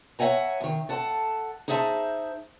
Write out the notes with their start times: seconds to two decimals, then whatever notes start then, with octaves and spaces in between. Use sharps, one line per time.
0.19 C#5 E5 F#5 G#5 A#5
0.60 E2 D#3
0.89 A4 F#5 A5
1.68 D#4 G#4 C5 E5 G#5 A5